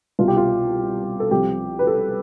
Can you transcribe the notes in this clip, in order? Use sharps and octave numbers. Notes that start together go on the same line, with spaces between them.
C2 B2 F4
G4
F4
A4
C2 C3 F3 G4
B4
A4